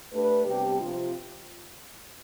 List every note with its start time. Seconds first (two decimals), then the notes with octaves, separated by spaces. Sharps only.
0.13 A3 D4 G4 B4
0.46 C3 G3 B3 D4 G4
0.80 C3 F3 C4 F4